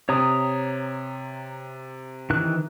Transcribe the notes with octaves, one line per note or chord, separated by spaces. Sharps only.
C3 C#5 A#5 D#6
D#3 E3 F#6